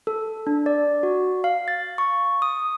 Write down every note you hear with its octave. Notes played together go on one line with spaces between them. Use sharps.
A4
D4
D5
F#4
F5
A6
C#6
D#6